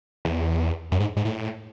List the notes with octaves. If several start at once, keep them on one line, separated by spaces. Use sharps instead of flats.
E2
F#2
G#2
G#2
A2